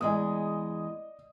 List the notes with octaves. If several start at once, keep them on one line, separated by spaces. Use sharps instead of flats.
E2 G#3 G#4 D5 D#5 D#6